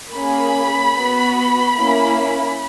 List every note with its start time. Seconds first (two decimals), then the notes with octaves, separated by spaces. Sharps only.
0.13 A#3 C#4 G#4 B5
0.94 B3 F#4
1.76 A#3 C#4 E4